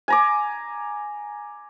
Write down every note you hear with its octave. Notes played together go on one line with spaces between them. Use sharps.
G#5 A#5 D6